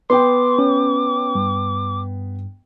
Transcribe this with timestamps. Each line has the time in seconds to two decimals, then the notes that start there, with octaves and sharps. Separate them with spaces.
0.10 B3 G5 C6 D6
0.59 C#4
1.35 G2